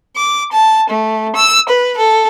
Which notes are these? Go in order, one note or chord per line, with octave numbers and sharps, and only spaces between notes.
D6
A5
A3
E6
B4
A4